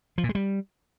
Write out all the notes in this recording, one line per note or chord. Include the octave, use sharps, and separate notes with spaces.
F3
A#2
G#3
G3